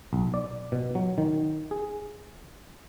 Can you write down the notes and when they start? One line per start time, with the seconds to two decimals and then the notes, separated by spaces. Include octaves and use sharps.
0.13 B1
0.34 D5
0.72 B2
0.95 F#3
1.18 D#3
1.71 G#4